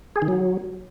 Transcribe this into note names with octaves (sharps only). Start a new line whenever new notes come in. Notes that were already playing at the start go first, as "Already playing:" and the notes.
G#4
D#3
F#3